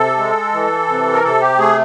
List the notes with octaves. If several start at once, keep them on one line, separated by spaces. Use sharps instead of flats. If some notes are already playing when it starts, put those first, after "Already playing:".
Already playing: C3 A4
G#3
E3
C3
A#4
C3 A4
G4
A3 G#4